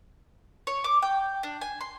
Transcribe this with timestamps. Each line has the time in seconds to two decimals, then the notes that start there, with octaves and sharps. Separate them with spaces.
0.67 C#5
0.84 D6
1.02 G5
1.43 D4
1.61 G#5
1.81 C6